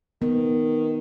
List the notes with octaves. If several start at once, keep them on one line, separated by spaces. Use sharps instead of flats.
D#3 B3